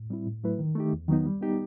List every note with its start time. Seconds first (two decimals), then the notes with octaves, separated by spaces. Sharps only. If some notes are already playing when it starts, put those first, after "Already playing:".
Already playing: A2
0.10 G3 C4 E4
0.27 A2
0.44 F#3 A3 E4 B4
0.59 D#3
0.75 A3 D#4 G4
0.93 E2
1.09 D#3 F#3 B3 D#4
1.26 G3
1.41 B3 D#4 G4